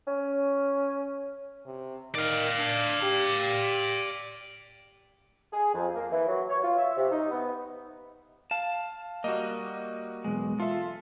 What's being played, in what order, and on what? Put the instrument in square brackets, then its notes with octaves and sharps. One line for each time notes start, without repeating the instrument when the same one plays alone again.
[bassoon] C#4
[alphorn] C3
[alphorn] D#3 [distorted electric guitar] D5 F5
[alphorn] D4
G4
[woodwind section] G#4
F2
A#3
E3
F#3
C#5
F4
E5
C3
D#4
B3
[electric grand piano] F5 [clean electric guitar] A5
[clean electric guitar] G3 A#3 [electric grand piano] F#4 D#5
[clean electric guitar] B1 E2 G#3
[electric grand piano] F4 E5 [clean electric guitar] A4